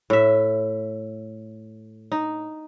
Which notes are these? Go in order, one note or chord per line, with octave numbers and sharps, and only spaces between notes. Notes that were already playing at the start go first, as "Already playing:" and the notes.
A2 E5
D#4